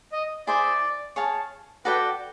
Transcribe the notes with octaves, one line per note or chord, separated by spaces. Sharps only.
D#5
E4 G#4 C5 D5 E5
G#4 C#5 F5 A5
F#4 A4 B4 D5 G5